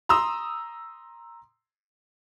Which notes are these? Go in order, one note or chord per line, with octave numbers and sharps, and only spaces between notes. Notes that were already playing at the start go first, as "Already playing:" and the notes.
A#5 C6 D#6 E6